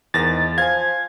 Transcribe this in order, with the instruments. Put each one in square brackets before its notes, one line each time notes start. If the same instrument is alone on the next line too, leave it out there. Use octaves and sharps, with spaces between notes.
[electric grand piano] E2 A#6 [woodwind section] G#2 D#3 [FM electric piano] A6
[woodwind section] F3 [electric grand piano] F5 G#5 [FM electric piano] G#6